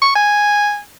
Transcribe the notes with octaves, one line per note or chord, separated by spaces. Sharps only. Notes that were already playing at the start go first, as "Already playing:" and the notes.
C#6
G#5